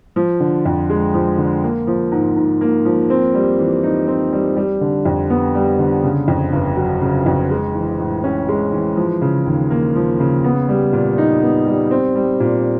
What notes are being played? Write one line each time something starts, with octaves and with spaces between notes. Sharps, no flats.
F3
D3
F2
G#3
F3
D3
A#3
F3
G#2
G#2
A#3
F3
C4
G3
E3
D#4
C4
G3
G3
D3
F2
B3
G3
D3
C#3
F2
G1
F#3
C#3
F2
G#3
E3
A2
C#4
G#3
E3
F3
C#3
D#2
A#3
F3
C#3
B3
G3
A#2
D#4
B3
G3
C4
G3
A#2